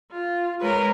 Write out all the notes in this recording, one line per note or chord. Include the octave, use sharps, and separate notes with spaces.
F4
G#3 A#4 B4 C#5